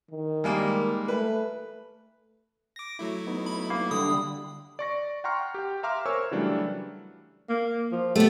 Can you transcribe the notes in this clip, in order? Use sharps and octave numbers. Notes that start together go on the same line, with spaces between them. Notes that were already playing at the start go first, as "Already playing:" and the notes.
D#3
G3 G#3 A#3
A3 B4
D6 A#6
F#3 A3 E4
B3 D#4
B5
A#3
D3 G3 B5 D#6
D5 C#6 A#6
F#5 G5 A#5 C6 C#6 F6
G4 G5
E5 F5 A#5 C6 D6 F6
A#4 C5 C#5 G#5 C#6 E6
C#3 E3 F#3 G3 A3 D4
A#3
F3
A3 B3 G4